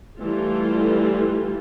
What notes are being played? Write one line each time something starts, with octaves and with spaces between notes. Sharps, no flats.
E3 G3 A3 F4